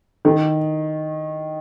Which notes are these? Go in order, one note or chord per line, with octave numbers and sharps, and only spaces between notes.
D#3